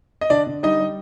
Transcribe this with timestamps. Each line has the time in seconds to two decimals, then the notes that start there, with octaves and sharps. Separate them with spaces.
0.21 D#5
0.30 D3 D4 D5
0.47 D3
0.63 G3 D#4 D#5
0.80 G3